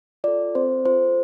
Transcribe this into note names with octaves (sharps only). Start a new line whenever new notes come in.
F4 A4 D5
C4 C5
F4 A4 C5